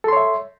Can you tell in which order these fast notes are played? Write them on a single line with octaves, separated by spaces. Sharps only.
A4 C6 C#5 E5